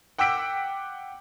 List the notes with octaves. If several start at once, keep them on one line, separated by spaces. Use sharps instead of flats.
F#5 G5 D6 E6 B6 D7